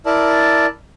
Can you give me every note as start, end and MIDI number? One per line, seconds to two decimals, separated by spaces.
0.06 0.66 64
0.06 0.66 70
0.06 0.66 74
0.06 0.66 81